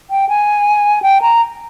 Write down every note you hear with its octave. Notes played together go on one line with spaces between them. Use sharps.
G5
G#5
G5
A#5